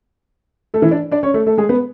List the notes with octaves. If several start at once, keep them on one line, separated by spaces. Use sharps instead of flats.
A3 A4
E3 E4
D4 D5
D4 D5
C#4 C#5
A3 A4
A3 A4
G#3 G#4
B3 B4